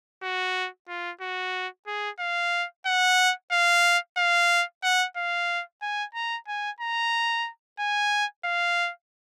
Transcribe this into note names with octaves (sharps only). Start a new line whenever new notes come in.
F#4
F4
F#4
G#4
F5
F#5
F5
F5
F#5
F5
G#5
A#5
G#5
A#5
G#5
F5